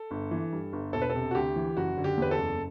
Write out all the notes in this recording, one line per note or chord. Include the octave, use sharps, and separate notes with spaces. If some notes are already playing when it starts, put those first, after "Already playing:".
Already playing: A4
G1
E3
G2
G1
E1 A4
B4
A4
C3
F#4
D2 G4
E3
F#1 F#4
D3
G4
E2 B4
A4
F#1